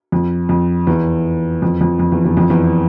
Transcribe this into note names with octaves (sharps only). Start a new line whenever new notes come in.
F2
F2
E2
F2
F2
F2
E2
E2
F2
E2